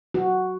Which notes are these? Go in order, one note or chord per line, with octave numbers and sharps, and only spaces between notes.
F#4